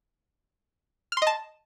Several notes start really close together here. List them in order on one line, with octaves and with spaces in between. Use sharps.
F6 C6 D#5 A5